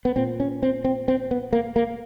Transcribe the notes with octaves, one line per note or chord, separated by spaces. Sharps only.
B3
A#2 C4
C#4
C4
C4
C4
B3
A#3
A#3